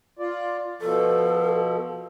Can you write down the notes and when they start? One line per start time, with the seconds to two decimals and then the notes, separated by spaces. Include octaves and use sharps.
0.19 F4 D5
0.81 B2 F3 A4